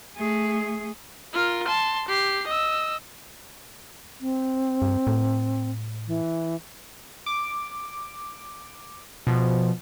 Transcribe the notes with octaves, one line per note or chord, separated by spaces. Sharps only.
A3 G#4
F4 A#4
A5 C6
G4 C7
D#5 E6
C4
G2
A2
E3
D6
B2 F3